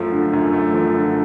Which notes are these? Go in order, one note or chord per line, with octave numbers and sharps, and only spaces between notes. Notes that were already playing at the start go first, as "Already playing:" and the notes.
Already playing: F#2 F3 A3
D3
F#2
A3
F3
D3